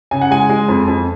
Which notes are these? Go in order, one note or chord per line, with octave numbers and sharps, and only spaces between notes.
C#3 G#5
F#5
G#3 G#5
G#3
F2
F2